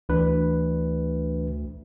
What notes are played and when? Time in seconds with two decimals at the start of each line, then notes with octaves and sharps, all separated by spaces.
0.09 D2 E3 D4 B4